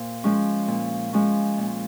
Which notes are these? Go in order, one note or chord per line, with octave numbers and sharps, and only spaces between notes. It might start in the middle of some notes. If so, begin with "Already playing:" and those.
Already playing: A#2 C5
F3 G#3 C#4
A#2
F3 G#3 C#4
A#2